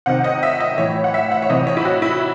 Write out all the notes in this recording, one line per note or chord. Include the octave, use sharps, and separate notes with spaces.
C3 D#3 F#5
D#5
E5
D#5
A2 E3 C#5
F#5
E5
F#5
C#5
C3 E3 D#5
C#5
E4
F#4
E4